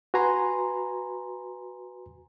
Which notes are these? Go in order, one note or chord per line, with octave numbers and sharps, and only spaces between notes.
F#4 B4 G#5 A#5 C6